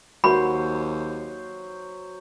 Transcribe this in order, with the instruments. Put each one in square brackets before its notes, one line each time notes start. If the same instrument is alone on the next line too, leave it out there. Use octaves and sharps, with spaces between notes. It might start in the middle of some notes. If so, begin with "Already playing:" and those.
[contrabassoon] D#2 [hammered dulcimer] F#3 C5 C6 [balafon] F#4 A#4 [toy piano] B5